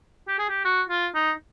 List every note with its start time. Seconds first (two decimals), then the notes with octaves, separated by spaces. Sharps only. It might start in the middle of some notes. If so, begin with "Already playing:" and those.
0.28 G4
0.39 G#4
0.49 G4
0.65 F#4
0.90 F4
1.15 D#4